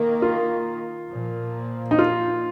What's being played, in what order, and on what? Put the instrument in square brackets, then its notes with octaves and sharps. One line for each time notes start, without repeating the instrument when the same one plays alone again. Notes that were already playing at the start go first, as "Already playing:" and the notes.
Already playing: [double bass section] D#3 A#3
[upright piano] F4
[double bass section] A#2 F3 A#3
[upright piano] D#4
F4